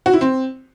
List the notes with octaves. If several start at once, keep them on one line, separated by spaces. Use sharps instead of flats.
F#4
E4
C4